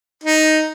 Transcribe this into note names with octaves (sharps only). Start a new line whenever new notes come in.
D#4